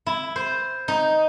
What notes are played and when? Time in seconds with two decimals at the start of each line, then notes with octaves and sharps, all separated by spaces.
0.06 E4
0.36 C5
0.88 D#4